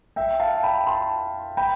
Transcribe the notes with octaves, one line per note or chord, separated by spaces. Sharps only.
E5 G5
F5 A5
G5 B5
A5 C6
G5 B5